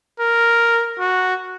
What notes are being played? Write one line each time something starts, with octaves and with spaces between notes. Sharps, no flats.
A#4
F#4